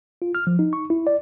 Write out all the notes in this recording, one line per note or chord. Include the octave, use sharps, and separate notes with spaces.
F4
F6
F3
D#4
C#6
E4
D5